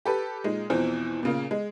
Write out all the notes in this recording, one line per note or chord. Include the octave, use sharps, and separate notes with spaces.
G4 A4 B4
A#2 G#3 D#4
E2 B2 E3 F3 C4
A#2 C#3 A#3
G#3